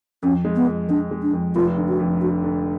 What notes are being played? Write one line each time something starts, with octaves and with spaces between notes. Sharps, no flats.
F2 C#4
G#3
B3
F2
G#3 D4
G#3
D4
F2
F1 F4
D3
F#4
F2
D3 F#4
D3